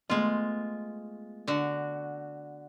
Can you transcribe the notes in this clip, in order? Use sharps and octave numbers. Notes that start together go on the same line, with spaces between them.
G#3 A3 B3 F4 D#5
D3 F#4